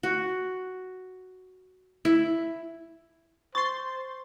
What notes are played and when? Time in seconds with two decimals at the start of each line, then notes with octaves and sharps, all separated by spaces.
0.03 F#4
2.05 E4
3.55 C5 C6 C#6 A6